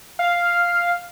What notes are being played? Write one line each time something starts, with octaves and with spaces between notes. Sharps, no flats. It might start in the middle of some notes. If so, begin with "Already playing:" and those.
F5